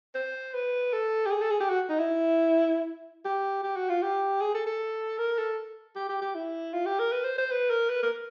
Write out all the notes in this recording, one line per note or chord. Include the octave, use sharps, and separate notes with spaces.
C5
B4
A4
G4
G#4
A4
G#4
G4
F#4
D#4
E4
G4
G4
F#4
F4
G4
G#4
A4
A4
A#4
A4
G4
G4
G4
E4
F4
G4
A#4
B4
C5
C5
B4
A#4
B4
A#4